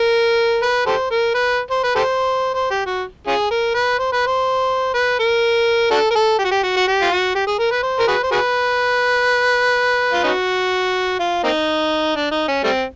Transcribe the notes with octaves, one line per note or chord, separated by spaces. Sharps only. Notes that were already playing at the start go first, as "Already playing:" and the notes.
Already playing: A#4
B4
G4 A4 C5
A#4
B4
C5
B4
G4 A4 C5
C5
G4
F#4
C#4 F4 G#4
A#4
B4
C5
B4
C5
B4
A#4
D4 F#4 A4
A#4
A4
G4
F#4
G4
F#4
F#4
G4
F4
F#4
G4
G#4
A#4
B4
C5
A#4
F#4 G#4 B4
C5
F#4 G#4 B4
F4
C#4 D#4 F#4
F4
A#3 C4 D#4
D4
D#4
C#4
G3 A3 C4